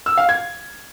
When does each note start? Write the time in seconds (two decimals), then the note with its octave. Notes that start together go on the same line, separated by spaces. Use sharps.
0.06 E6
0.17 F5
0.29 G#6